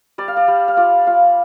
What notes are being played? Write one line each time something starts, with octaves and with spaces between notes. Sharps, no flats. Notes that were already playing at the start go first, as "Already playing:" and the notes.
G3 D5
F5
D5
G3
F5
F4 D5
F4 F5